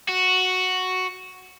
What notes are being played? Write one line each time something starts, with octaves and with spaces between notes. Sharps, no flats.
F#4